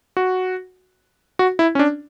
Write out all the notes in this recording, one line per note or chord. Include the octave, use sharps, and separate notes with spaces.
F#4
F#4
E4
C#4
D4